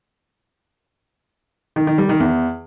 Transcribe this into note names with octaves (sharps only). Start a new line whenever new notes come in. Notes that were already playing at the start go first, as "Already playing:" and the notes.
D#3
D#3
G3
D#3
E2